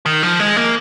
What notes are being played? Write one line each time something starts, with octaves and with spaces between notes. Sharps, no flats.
D#3
F3
G#3
A#3